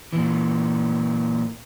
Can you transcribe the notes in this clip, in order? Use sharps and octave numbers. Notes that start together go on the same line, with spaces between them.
A#2 E3